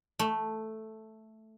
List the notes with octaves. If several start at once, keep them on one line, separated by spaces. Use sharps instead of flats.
A3